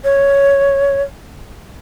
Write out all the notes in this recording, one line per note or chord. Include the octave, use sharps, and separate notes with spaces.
C#5